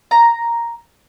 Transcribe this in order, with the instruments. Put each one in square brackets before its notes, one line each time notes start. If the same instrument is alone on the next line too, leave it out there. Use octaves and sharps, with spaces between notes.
[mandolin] A#5